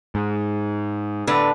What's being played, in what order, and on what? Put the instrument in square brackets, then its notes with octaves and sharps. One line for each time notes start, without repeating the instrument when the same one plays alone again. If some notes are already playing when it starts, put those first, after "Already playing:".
[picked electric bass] G#2
[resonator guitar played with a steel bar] A2 D3 B4